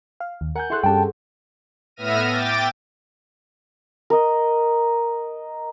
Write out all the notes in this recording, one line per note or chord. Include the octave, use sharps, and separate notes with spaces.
F5
D#2
A#4 F#5 G#5 G6
E4 G#4 A4 C#5 C6 F#6
G2 C#4 G4 G5 A5
C4
A2 B3 E5 F6 A#6 D#7
G5 D6 A6
A#4 D#5